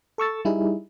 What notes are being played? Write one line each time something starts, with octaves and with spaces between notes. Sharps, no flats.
A4 C#6 E6 A6
G3 D#4 E4 G#4